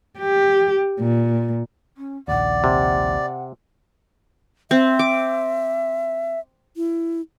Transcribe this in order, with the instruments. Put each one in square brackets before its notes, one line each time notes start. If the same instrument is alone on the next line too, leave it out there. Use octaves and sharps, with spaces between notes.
[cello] G4
A#2
[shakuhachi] C#4
[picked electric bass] A#1 D#2 [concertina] D5 [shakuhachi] F#5
[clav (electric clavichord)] C3
[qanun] C4 [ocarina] E5
[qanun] D6
[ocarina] E4